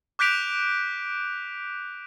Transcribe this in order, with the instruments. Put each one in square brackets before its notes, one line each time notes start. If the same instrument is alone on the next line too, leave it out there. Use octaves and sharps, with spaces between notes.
[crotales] D6 F#6 G6 B6 D7 F7